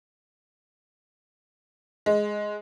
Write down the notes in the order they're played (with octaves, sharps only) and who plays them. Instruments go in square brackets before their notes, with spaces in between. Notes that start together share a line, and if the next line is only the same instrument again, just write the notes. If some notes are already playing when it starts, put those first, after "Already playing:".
[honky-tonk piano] G#3